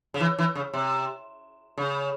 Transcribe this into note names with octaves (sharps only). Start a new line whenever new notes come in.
C#3
E3
E3
C#3
C3
C#3